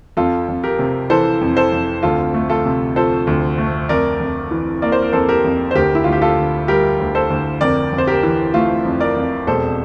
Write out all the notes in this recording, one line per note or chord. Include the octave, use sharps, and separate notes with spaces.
F2 F4 A4
F2
G4 A#4
C3
E3 A4 C5
F2
A4 C5
F2
D2 F4 A4
A3
F4 A4
C3
F3 A4 C5
D2
A3
F2 A#4 D5
F2
E3
A#3 D5
C5
A#4
F2 A4 C5
G4 A#4
F2
C5
D2 G4 A#4
E4
D2 F4
G4
F4 A4
D3
G3 G4 A#4
D2
A4 C5
D2
F2 A#4 D5
F2
C5
G4 A#4
E3
A3 F4
F2
A#4 D5
F2
E1 A4 C5